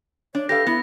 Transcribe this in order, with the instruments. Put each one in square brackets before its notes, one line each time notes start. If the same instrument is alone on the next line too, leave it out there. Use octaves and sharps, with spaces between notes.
[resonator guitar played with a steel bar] D4 [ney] C#5
[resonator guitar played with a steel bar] G4 B4 F5 [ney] A4 [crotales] A#6
[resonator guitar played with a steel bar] B3 [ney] E4